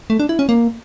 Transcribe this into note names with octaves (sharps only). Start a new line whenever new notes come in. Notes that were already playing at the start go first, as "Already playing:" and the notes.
A3
D4
E4
C#4
A#3